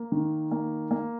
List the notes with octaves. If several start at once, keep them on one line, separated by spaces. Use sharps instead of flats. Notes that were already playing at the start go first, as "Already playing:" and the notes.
Already playing: A#3
D#3
A#3
A#3